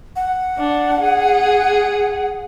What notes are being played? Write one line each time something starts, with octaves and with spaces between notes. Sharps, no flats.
F#5
D4
G#4